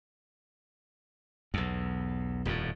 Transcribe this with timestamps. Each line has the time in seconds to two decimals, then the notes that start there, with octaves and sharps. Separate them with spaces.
1.54 B1 E2
2.45 D#1 F2 A2